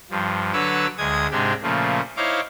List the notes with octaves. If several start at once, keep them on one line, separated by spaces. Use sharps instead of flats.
G2 F3
D3 F#3 B4 C#5 D6 E6
D2 G#3 D#6 G#6
G#2 C3 G#3 D4 G4
A#2 C#3 F3 A3
D#4 E4 C5 C#5 F5 D6